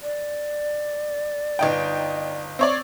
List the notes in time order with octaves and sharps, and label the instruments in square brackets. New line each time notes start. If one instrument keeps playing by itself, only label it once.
[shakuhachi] D5
[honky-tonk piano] G1 D#4 G5
C4 C#5 D5